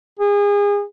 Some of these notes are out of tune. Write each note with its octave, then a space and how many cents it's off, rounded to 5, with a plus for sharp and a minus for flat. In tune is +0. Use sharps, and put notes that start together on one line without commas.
G#4 -30